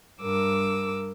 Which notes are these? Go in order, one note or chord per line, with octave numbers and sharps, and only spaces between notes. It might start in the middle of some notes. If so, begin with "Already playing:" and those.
G2 A#4 D6 E6